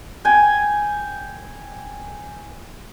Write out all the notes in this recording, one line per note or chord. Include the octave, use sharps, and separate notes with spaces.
G5 G#5